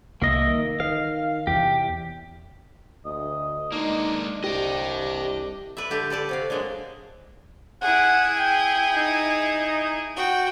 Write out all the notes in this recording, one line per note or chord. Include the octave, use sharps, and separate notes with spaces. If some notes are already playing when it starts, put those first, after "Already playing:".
C2 A#3 D#5 E5
D#3
D#3 F5
E2 C3 G4
D2 D#5
G#3 A#3 D4 D#4
C2 G4 D#5 G5
B4 D5 E5
D3 G4 E5 A5
A4 B4 D5 A5
C3 F#4 F5
F#3 G#3 A#3 D4
E4 G#4 F#5
G5
D#4
F#4 G5